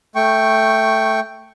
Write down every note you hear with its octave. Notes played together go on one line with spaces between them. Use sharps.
A3 G5 C#6